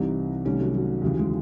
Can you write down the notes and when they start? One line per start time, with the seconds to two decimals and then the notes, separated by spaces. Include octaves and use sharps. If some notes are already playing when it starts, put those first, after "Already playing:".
Already playing: C2 C3 E3 C4 D#4
0.45 C2 C3 D#3 A3 C#4
0.59 F#3 A3
0.74 F#3
1.01 D#2 C#3 E3
1.19 G#3